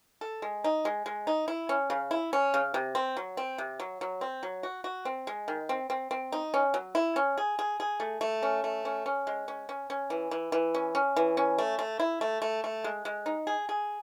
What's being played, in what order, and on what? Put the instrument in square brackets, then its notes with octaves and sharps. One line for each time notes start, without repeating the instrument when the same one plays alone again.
[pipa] A4
G#3
D#4
G#3
G#3
D#4
E4
C#4
C#3
E4
C#4
C#3
C3
C4
F#3
C4
C3
F#3
F#3
C4
F#3
F#4
F#4
C4
G#3
D#3
C4
C4
C4
D#4
C#4
F#3
E4
C#4
G#4
G#4
G#4
A3
A3
C#4
A3
C#4
C#4
G#3
C#4
C#4
C#4
E3
E3
E3
C#4
C#4
E3
C#4
A3
A3
E4
A3
A3
A3
G#3
G#3
D#4
G#4
G#4